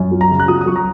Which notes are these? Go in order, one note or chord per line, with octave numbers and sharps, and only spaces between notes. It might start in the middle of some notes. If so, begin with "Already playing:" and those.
Already playing: F#2
F#3
A#5
C#3
F#6
F#3 D#6
D#6
F#3 C#6
A#5